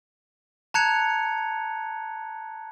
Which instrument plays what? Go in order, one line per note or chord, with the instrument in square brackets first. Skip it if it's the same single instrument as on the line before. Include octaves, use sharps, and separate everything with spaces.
[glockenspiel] A5 A#5 F#6 G#6 C#7 F7